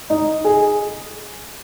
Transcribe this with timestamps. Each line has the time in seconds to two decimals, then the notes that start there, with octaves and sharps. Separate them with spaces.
0.10 D#4
0.44 G#4